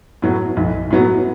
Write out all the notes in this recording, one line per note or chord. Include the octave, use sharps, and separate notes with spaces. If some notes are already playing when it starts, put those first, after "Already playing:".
A2 F#3 B3 F#4
B1
A2 F#3 B3 F#4